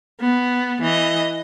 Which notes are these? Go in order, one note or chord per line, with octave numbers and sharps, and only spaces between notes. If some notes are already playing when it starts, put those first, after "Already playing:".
B3
E3 D#5